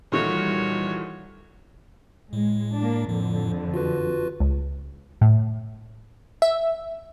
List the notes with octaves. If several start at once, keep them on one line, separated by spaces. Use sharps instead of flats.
A#2 D#3 E3 G3 A3 F#4 C#5
A2 G#3
A#3 D4
F2 A2 D3
F4 F#4 B4
C#2
A2
E5